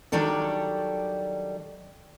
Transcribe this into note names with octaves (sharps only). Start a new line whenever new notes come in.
D#3 F#3 G3 D4 A4 D5